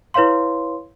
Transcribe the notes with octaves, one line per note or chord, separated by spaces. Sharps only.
E4 B4 C#5 F5 C6